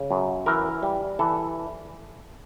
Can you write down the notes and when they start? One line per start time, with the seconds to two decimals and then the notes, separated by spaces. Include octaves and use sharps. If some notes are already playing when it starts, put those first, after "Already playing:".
Already playing: C#3
0.11 F#2
0.46 E3 A#4
0.83 G3
1.19 E3 A4